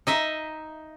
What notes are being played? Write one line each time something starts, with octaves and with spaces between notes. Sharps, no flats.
D#4 D#5 E5